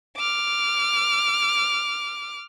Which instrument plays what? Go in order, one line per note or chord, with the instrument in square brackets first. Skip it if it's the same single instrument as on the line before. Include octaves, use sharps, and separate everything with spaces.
[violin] D6 F6